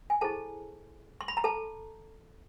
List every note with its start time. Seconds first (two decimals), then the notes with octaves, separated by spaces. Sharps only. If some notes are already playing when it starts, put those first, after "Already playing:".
0.10 G#5
0.21 E4 G#4 A4 C5 A5
1.21 C6
1.28 B5
1.37 A#5
1.44 A4 A5